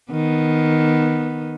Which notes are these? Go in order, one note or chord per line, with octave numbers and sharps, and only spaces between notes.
D#3 B3